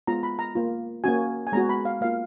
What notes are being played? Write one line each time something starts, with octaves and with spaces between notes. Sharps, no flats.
G#3 B3 F4 A#5
B5
A#5
A#3 F4
A#3 C#4 F#4 G#5
G#5
G#3 B3 F#4 A#5
B5
F5
A#3 F4 F5